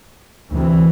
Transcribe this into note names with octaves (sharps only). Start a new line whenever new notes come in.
D2 C3 E3